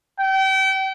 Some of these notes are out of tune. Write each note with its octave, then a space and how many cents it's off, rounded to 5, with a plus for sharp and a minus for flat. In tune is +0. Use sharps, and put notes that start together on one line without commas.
G5 -35